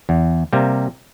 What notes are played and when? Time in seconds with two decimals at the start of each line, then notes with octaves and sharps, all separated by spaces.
0.09 E2
0.53 C3 G3 A#3